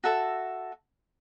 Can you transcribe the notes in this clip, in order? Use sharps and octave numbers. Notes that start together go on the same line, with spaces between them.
F#4 A4 E5 A5